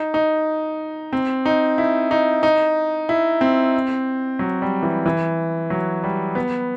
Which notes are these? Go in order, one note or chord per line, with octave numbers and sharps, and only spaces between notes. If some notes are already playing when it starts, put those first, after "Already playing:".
Already playing: D#4
D#4
C4
D#4
E4
D#4
D#4
E4
C4
F#3
G3
E3
E3
F#3
G3
B3